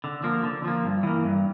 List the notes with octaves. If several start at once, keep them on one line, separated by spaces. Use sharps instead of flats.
D3
F3 A#3
D3
F3 A#3
G2
E3 A#3
G2